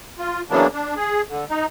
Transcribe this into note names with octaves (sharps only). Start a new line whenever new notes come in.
F4
C#3 E3 F#3 A#3 B3 D4
D4
G#4
D3
D#4